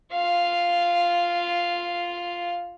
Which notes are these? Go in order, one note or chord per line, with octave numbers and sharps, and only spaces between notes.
F4 F5